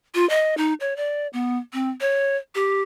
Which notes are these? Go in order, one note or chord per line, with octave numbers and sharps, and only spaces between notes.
F4
D#5
D#4
C#5
D5
B3
C4
C#5
G4